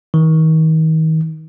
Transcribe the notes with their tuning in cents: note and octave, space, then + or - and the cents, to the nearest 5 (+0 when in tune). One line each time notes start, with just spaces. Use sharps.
D#3 +35